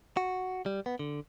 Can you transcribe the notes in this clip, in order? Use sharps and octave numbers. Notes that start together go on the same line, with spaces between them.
F#4
G3
B3
D3